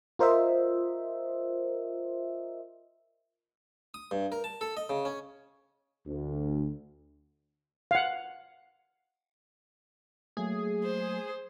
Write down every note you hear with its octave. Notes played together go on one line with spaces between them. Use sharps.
F4 A#4 C5 D#5 E5
D#6
G2
A#4
A5
A4
D#5
C#3
C#4
D2
F5 F#5
F#3 A3 A#3 G#4
C5